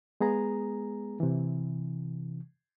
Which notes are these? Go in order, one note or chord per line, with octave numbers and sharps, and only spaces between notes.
G#3 B3 G#4 A#5
C3 E3